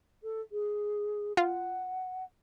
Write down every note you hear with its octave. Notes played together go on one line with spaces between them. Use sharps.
A4
G#4
F4 F#5